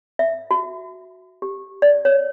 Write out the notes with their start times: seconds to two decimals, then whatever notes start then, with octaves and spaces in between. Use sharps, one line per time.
0.19 E5
0.51 F#4
1.42 G4
1.82 D5
2.05 C#5